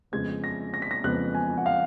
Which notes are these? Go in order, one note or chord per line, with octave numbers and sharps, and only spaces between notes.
F2 C#3 G#3 B3 G#6
A#6
A#6
B6
A#6
F2 C#3 G#3 B3 F#6
G#5
F#5
F5